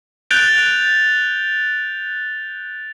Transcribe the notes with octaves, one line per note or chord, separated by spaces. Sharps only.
F#6 G6 A6 D7 F7 G7